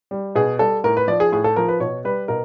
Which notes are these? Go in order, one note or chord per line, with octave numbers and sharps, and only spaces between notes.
G3
B2 G#4
G3 A4
A2 A#4
B4
F3 D5
G#4
A2 G#4
A4
F3 A#4
B4
B2 C#5
G3 B4
B2 A#4